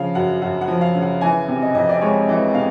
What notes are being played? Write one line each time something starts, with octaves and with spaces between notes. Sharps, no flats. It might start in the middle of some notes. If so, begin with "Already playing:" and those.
Already playing: C#3 F3 F5
F#2 F#5
F#2 F#5
F#5
F3
F5
C#3
F#5
E3 G#5
C3
D#5
F2 D#5
D5
G#3 C#5
E3
C3 F5